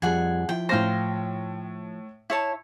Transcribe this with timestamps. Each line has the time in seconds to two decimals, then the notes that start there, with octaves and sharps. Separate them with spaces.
0.02 F2 F3 G3 G#4 F#5 G#5
0.49 F3 E4 G5
0.69 A2 C5 F5 G5 A#6
2.30 E4 C#5 A5